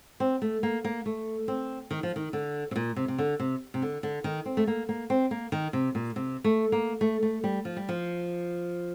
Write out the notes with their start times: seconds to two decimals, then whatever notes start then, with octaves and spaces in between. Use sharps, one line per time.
0.20 C4
0.42 A3
0.63 A#3
0.84 A#3
1.06 A3
1.48 C4
1.91 D#3
2.03 F3
2.16 D#3
2.33 D3
2.71 C3
2.76 A#2
2.96 C3
3.08 C3
3.18 D3
3.39 C3
3.74 C3
3.82 D3
4.03 D3
4.24 D#3
4.46 C4
4.57 A3
4.67 A#3
4.89 A#3
5.10 C4
5.31 A#3
5.52 D#3
5.73 C3
5.95 A#2
6.16 C3
6.44 A3
6.72 A#3
7.01 A3
7.23 A3
7.44 G3
7.65 F3
7.77 G3
7.89 F3